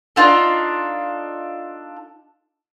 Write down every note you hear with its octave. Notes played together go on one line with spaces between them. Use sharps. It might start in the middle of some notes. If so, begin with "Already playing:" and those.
D4 D#4 F4 A4